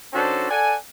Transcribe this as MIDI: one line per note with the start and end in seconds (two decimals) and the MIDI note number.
0.13 0.48 51
0.13 0.48 61
0.13 0.48 62
0.13 0.48 66
0.13 0.48 69
0.13 0.48 72
0.51 0.75 69
0.51 0.75 74
0.51 0.75 78
0.51 0.75 80